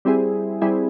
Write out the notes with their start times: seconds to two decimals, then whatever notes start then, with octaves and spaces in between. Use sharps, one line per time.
0.05 G3 C4 E4 G#4
0.62 G3 C4 E4 G#4